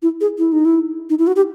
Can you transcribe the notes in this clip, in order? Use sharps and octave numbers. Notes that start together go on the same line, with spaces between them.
E4
G#4
E4
D#4
E4
D#4
E4
F#4
G4